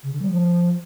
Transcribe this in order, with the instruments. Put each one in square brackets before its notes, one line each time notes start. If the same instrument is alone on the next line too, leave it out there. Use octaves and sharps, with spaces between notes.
[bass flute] C#3
D3
G3
F3